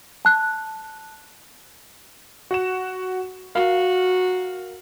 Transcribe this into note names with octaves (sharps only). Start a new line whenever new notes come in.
A5 F#6
F#4 F#5 E7
F#4 A#4 F5